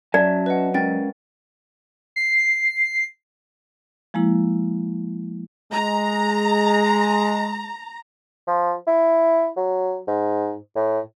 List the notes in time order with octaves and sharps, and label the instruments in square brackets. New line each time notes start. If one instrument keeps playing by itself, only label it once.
[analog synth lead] F#3 [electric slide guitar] C#4 E5 A5 [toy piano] D5
[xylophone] B4 D#5 F#5
[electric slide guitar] G#3 C#4 A#4 [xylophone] G5 A6
[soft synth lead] C7
[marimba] F3 G#3 A#3 E4
[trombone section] G#3 [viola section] A#5
[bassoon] F3
E4
F#3
G#2
A2